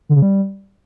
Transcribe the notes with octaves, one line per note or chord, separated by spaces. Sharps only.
D3
C#3
G3